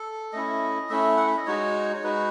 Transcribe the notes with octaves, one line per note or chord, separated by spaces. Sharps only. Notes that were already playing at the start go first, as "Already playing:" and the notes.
Already playing: A4
A3 C#4 E4 D#5
A3 C#4 E4 E5
F#5
E5
D#5
G#3 D#4 F#4 C#5
C#5
G#3 D#4 F#4 B4